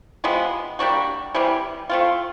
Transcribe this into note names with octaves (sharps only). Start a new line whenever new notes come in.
C3 F3 G#3 B3
G3 A#3 D4 F#4
C3 E3 G3
A3 C4 F4